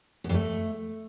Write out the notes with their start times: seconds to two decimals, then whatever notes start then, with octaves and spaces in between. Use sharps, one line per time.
0.24 F#2
0.29 F2
0.34 A3